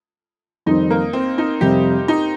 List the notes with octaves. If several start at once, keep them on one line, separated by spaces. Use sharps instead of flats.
F2 D#3 G3 C4 D#4
A#3
C4
D#4
F2 C3 G3 C4 G4
D#4